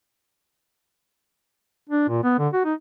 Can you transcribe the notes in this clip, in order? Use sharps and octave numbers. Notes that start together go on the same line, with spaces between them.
D4
A#2
B3
D3
F#4
D#4